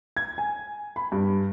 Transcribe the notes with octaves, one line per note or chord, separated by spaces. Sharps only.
G#6
G#5
B5
G2